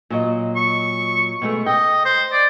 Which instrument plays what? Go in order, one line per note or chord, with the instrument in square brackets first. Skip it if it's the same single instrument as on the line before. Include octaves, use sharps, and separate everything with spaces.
[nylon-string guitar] A#2 F#3 D#5
[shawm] C#6
[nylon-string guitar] B2 G#3 A3
[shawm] D#5 [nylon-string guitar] G5
[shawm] C5
D5